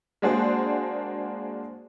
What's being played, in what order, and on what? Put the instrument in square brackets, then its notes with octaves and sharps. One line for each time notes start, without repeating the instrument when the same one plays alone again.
[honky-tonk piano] G#3 A#3 D4 F#4 G#4 C5